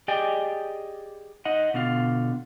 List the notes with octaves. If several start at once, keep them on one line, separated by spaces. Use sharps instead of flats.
G4 G#4 D5 D#5 G5 G#5
D#4 D#5 F#5
B2 D3 B3 F4 F5